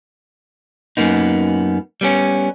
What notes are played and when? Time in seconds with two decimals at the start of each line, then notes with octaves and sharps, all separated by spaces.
0.97 F#2 C3 A#3 B3 D#4
2.01 G3 B3 C#4